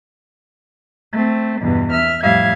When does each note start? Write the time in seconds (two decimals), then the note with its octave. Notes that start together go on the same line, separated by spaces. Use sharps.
1.13 A3 C4
1.61 E2 G2 B2
1.92 E5 F6
2.21 F2 A2 G3 E5 F5 G#6